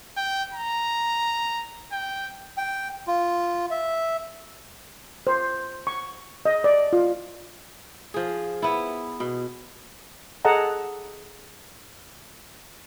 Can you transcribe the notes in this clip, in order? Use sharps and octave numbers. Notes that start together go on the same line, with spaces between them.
G5
A#5
G5
G5
F4
E5
C5
C#6
D#5
D5
F4
F3 G#4
B3 E4
B2
G#4 A4 D#5 F#5 A5 A#5